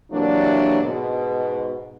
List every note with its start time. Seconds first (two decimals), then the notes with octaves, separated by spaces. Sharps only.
0.11 C3 E3 F#3 A#3 D4
0.81 G#2 B2